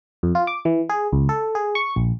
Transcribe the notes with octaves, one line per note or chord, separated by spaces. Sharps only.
F2
F4
D6
E3
G#4
C#2
A4
G#4
C#6
A#1